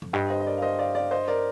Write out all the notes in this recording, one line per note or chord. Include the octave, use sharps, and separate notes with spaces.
F2
G2 D#5 G5
C5 D#5
D#5
A#4 D5
F5
C5 D#5
D5 F5
D5 F5
C5 D#5
A#4 D5